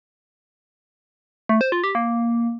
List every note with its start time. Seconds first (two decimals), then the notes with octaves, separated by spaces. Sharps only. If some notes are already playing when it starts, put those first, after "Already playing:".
1.49 A3
1.61 C5
1.72 F4
1.84 G4
1.95 A#3